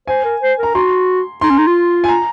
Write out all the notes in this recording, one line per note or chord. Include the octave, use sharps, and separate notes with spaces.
C5 G#5
A#4
C5
A#4 A#5
F#4 C6
D#4 C6
C#4
D#4
F4
G#5
A#5